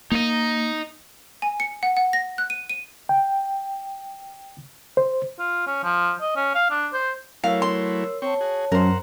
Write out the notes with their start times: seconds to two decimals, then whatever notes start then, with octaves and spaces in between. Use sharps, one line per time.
0.12 A#3 D#4 D#5
1.42 G#5
1.60 C#7
1.83 F#5
1.97 F#5
2.13 A#6
2.38 F#6
2.50 D#7
2.69 D#7
3.09 G5
4.97 C5
5.39 F4
5.67 C#4
5.84 F3
6.21 D#5
6.36 C#4
6.55 F5
6.70 D4
6.93 C5
7.44 F#3 A3 E4 A#4 C#5 F5 E6
7.62 C6
8.22 C4 C#5 G5 A5 C#6
8.41 F#4 G#4
8.72 F#2 A#4 C5 F#5